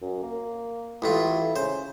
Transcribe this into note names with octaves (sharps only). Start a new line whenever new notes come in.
F#2
A#3
A1 A2 E4 F4
C#3 C5